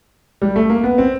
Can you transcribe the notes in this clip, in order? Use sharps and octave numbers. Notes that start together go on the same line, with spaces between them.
G3
A3
A#3
B3
C4